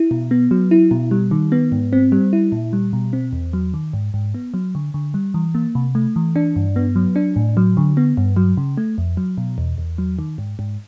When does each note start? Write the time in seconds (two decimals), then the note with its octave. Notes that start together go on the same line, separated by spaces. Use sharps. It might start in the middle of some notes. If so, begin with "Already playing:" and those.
Already playing: E4
0.11 B2
0.31 B3
0.51 F#3
0.71 E4
0.91 B2
1.11 G3
1.31 D#3
1.52 B3
1.72 G#2
1.93 C4
2.12 G3
2.33 E4
2.52 A#2
2.73 G3
2.93 B2
3.13 C4
3.33 E2
3.53 F#3
3.74 D#3
3.93 G#2
4.14 G#2
4.34 B3
4.54 F#3
4.75 D3
4.94 D3
5.14 G3
5.34 E3
5.55 A#3
5.75 C3
5.95 A3
6.16 E3
6.36 D4
6.56 G2
6.76 B3
6.96 F#3
7.16 D4
7.36 A2
7.57 F#3
7.77 D3
7.97 B3
8.17 G2
8.36 F#3
8.57 C#3
8.78 A3
8.98 F2
9.17 F#3
9.38 B2
9.58 E2
9.78 E2
9.98 F#3
10.19 D#3
10.38 G#2
10.59 G#2